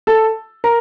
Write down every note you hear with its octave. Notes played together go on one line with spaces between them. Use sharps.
A4 A5
A#4 A#5